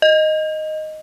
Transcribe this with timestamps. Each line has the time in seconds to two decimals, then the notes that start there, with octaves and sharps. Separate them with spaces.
0.02 D#5